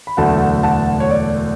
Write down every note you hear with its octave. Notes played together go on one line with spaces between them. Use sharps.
B5
E1 D2 D3 F#3 A3 F#5 A5
F#5 A5
C#5
D5